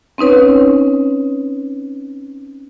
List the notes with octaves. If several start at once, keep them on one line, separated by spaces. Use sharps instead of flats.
C4 C#4 D#4 B4 C#5